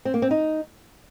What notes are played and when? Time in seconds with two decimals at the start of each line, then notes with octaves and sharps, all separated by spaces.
0.05 C4
0.14 A#3
0.22 C4
0.31 D#4